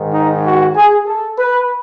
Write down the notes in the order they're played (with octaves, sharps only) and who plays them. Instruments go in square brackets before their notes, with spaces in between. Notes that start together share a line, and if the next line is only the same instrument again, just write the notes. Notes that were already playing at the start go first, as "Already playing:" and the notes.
Already playing: [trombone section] G#2 D#3
D#4
F#4
G#4
A4
B4